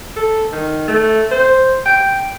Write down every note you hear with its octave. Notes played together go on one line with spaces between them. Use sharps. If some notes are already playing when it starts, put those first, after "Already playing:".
A4
D#3
A3
C5
G5